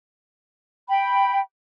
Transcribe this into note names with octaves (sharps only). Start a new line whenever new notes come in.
G5 B5